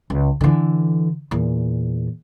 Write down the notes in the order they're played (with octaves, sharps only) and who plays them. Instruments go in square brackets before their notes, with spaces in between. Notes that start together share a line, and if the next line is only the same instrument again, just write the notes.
[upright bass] C#2
D3 E3
E2 A#2